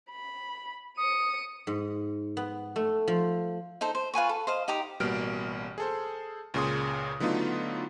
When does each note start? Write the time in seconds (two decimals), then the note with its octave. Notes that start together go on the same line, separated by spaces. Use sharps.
0.11 B5
0.98 D#6 C#7 D#7
1.67 G#2
2.37 B3
2.76 A3
3.08 F3
3.81 D#4 A4 C5
3.95 C5
4.14 F4 B4 G#5 C#6
4.29 A4
4.47 C5 D#5 F5
4.68 D#4 G4 A#5 D#6
5.00 A1 B2 G3 A#3 F6 D7
5.78 G#4 A4 C5
6.54 C#2 A#2 C#3 G#4 C6 D#6
7.20 D3 F#3 A3 B3 D#4 F4